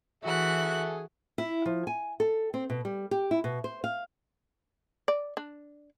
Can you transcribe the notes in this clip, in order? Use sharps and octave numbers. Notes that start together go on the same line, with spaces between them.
E3 F#4 G#4 A4 E5 F#6
E4
F3
G#5
A4
C4
B2
G3
G4
E4
B2
C5
F5
D5
D4